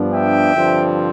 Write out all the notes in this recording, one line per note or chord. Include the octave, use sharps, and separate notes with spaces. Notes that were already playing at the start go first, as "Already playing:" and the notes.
Already playing: G2 F3 B3 D4
E5 G5
G2 D3 F3 C4